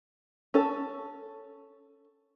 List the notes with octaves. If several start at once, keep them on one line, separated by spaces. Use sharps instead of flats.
C#4 A4